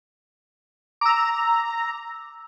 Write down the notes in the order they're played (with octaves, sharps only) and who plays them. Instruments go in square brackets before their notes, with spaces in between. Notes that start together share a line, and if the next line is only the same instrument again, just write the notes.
[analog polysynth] A#5 [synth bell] D6 E6